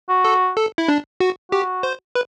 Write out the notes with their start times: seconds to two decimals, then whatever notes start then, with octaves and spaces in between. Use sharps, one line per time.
0.09 F#4
0.25 A4
0.57 A4
0.78 E4
0.88 D4
1.20 F#4
1.51 F#4 G4
1.83 C5
2.15 B4